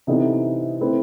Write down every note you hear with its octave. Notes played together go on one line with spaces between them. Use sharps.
C3 E3 B3 D#4 A4
A3 C4 E4 B4